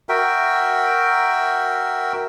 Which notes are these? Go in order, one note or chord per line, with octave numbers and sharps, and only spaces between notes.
F#4 A#4 E5 G5